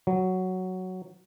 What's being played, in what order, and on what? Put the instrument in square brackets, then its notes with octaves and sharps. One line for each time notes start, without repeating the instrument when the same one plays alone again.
[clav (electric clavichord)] F#3